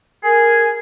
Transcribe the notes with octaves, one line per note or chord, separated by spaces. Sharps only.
G#4 A#4 G#5